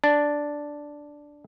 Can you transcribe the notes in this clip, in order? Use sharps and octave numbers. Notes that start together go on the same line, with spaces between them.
D4